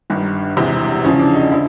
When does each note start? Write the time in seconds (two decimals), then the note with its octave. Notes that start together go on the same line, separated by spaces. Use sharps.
0.10 G1 G2 D#3
0.56 E1 E2 C3 E3
1.04 E2 C#3 F3 C#4
1.20 D4
1.35 D#4
1.51 D3 F3 E4